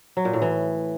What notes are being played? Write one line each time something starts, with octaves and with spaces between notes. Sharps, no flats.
F#3
A#2
A2
E3